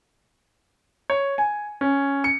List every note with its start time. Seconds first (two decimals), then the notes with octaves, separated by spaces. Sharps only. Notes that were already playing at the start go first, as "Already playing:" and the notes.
1.10 C#5
1.38 G#5
1.81 C#4
2.24 C#7